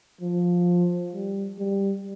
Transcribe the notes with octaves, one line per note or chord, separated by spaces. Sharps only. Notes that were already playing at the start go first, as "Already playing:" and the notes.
F3
G3
G3